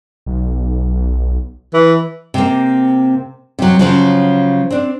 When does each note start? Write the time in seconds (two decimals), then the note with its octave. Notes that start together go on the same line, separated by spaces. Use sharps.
0.26 B1
1.74 E3
2.34 C3 A#3
3.59 C3 F#3
3.79 C#3 F3 F#3
4.70 C4 D4